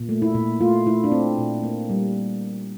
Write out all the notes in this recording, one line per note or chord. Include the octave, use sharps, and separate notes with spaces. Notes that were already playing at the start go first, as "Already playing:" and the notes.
Already playing: A#2
A3
E4
A#2
A3 F4
A3 E4
D4
A3 C4
A#2
A#3
G3